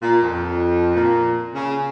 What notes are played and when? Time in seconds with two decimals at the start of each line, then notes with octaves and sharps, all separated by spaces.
0.02 A#2
0.22 F2
0.95 A#2
1.55 C#3